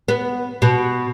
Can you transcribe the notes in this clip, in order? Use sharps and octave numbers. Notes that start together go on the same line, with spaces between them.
B3
B2